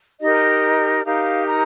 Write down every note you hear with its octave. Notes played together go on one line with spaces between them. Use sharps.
D#4 G4 A#4 D#5
D#4 G4 A#4 F5
A#5